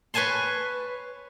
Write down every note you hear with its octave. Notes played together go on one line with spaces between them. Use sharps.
B4 C#5 G#5 A5 C6